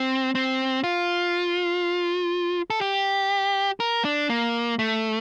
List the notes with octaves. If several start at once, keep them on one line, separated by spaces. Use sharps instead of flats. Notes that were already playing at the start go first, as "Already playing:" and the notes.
Already playing: C4
C4
F4
A4
G4
A#4
D4
A#3
A3